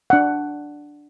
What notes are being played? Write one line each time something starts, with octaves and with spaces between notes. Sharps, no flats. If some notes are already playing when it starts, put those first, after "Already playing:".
D4 F#5